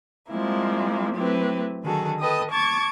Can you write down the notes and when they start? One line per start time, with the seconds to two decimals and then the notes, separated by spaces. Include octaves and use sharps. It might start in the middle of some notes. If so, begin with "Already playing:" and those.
0.29 F3 G3 G#3 A#3 C4 E4
1.13 F#3 A3 C4 E4 G4 B4
1.82 D3 D#3 F#3 F#4 G#4 A4
2.18 A4 B4 D#5 G5 D#6
2.50 A5 C#6 D6 G#6 A6